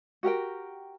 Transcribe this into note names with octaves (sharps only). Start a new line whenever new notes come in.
F#4 G4 A#4 G5